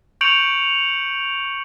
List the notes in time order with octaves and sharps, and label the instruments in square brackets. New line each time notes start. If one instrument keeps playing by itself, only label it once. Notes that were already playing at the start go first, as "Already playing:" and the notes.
[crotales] C#6 G6 C#7 D7 F7 F#7